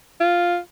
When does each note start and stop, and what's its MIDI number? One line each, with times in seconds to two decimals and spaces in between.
0.20 0.58 65